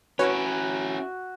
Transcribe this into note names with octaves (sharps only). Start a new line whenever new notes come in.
C#4 E4 F#4 B4 C#5 G#6